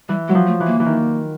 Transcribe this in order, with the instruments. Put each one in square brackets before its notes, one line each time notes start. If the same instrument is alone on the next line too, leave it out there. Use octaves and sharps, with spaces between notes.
[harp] E3 [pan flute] G3
[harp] F#3 [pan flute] G#3
[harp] F3
[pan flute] A3
[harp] E3
[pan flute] A#3
[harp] E3
D#3